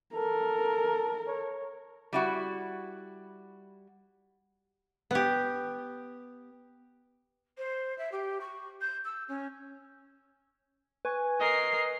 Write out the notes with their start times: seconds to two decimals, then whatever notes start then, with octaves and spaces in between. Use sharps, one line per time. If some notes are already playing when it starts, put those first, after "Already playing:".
0.14 A4 A#4
1.27 C#5
2.13 G3 E4 F#4
5.11 B3 G4
7.57 C5
7.98 E5
8.12 G4
8.41 C#6
8.81 G6
9.05 E6
9.28 C#4
11.05 B4 G#5 C#6
11.40 A#4 D#5 C7